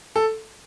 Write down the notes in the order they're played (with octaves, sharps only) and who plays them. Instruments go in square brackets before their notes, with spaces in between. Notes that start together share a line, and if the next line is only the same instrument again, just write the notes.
[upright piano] A4